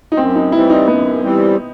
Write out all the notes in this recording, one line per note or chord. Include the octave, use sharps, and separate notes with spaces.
D#4
F#2 C4
D#4
E3 G3 C4 E4
D#4
F#2 B3
E3 G3 C4